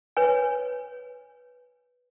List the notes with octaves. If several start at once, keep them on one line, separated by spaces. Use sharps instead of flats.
B4 C#5 G#5